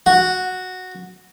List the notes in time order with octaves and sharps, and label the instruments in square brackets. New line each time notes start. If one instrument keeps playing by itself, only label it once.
[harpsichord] F#4